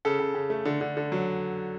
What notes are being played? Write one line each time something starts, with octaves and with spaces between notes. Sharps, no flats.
C#3 A4
C#3
C#3
A3
D3
D3
D3
F#3